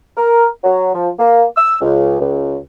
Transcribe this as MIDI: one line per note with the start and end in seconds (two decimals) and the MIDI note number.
0.16 0.47 70
0.63 0.90 54
0.94 1.09 53
1.19 1.45 58
1.57 1.76 88
1.81 2.19 37
2.20 2.57 37